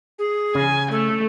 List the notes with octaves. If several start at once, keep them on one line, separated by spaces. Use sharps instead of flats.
G#4
C#3 G#5
A3 A4